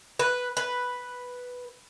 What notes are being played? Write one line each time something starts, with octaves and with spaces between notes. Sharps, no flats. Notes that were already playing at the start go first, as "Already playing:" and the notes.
B4
B4